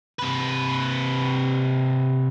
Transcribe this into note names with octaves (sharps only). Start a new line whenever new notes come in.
C3 B4